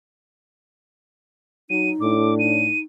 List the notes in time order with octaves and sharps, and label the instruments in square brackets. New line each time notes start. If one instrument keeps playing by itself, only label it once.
[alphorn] F#3 [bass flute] D#4 [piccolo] D#7
[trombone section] A2 [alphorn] D4 [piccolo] D6
[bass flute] D#4 [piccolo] D#7